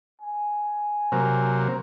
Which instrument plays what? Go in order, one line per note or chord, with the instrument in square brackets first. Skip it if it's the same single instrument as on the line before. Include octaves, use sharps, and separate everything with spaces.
[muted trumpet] G#5
[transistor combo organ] C3 F#3 A#3